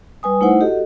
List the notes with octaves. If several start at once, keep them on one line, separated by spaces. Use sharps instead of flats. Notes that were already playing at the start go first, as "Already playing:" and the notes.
G3 B4 G#5 D#6
A3 D#4 E4 C5 F#5
F#4 G4 A4 D#5